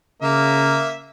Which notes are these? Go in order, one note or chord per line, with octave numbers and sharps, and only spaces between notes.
C#3 A#3 E5 A#5